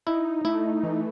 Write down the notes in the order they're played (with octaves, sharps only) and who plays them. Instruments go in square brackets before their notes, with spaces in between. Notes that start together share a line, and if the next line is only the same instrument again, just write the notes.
[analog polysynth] D#4 [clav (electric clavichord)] E4
[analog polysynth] A3 [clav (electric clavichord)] E4
[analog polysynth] E3